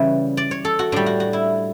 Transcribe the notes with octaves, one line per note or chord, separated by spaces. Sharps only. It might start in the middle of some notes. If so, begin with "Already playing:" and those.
Already playing: C#3 E3 G3 E5
D5
C#5
A4
F#4
A2 G3 D4
F#4
F#4
E4